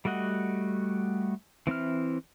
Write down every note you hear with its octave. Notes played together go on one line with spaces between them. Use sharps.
G3 A3 F#4 D#5 F#5
E3 C4 E4 F6